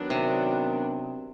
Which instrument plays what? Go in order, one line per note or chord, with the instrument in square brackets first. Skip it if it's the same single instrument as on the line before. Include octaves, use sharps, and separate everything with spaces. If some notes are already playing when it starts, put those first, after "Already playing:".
Already playing: [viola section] D#3 F#3 B3 D4
[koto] C3